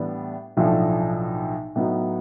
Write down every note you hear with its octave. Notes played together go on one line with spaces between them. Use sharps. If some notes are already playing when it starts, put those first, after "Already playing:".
Already playing: A2 E3 G3 B3 D4
B1 A2 F3 A3 D4
A2 F#3 B3 D#4